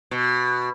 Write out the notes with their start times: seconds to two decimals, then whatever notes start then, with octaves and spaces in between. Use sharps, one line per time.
0.11 B2